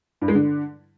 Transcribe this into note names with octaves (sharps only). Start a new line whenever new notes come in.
G2
G#3
D3